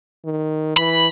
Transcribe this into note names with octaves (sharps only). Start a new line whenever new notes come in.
D#3
E3 B5